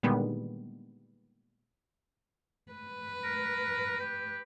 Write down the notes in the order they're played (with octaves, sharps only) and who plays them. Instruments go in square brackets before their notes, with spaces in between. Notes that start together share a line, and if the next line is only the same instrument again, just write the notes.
[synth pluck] A#2 D3 D#3 G3 G#3 B3
[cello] B4
[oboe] A#4
G4